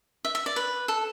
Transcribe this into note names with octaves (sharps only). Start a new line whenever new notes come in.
E5
E5
D5
B4
A4